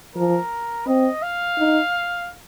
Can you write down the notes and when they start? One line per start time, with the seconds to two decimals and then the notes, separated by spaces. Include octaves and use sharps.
0.15 F3 A#4
0.87 C4 D#5
1.23 F5
1.58 D#4